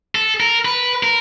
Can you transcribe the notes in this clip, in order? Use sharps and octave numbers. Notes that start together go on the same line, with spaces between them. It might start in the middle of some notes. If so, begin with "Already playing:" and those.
A4
A#4
B4
A#4